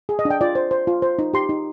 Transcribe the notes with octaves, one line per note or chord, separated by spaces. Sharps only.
G#4
D#5
D4
G5
F4 D5
C5
C5
F4
C5
D#4
G4 C6
D#4